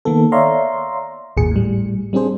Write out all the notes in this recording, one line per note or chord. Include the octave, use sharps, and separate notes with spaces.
D#3 A#3 B3 A4
C#5 D5 E5 F5 A#5 C6
G#1 D#2 A#2 G#4 C#7
A2 G3
G3 C4 D4 G#4 C5